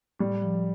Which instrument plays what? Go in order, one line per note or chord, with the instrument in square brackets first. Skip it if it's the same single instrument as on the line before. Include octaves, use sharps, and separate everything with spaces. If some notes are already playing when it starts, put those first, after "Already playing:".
[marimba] A2 [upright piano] G3
[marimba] F3